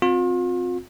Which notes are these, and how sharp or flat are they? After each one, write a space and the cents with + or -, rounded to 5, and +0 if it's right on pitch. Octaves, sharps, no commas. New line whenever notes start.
C4 +0 F4 +40